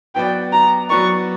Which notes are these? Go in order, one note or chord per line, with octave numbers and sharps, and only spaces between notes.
F#3 B3 F#4 B4 D5 G5
A#5
F#3 B3 F#4 B4 D5 C#6